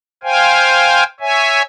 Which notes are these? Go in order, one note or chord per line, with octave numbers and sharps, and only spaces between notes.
C5 F5 G5 G#5
C#5 E5 G#5